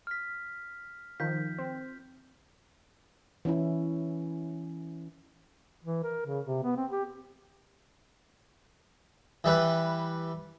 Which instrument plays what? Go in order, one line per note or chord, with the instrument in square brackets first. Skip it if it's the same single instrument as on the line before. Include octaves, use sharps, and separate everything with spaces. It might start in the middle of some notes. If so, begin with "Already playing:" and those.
[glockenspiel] F6 B6
[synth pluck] D#3 F3 [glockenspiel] G6 B6
[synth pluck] C4
[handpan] E3 C#4 E4
[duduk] E3
A#4
C#3
C3
B3
C4
G4
[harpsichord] E3 G3 B4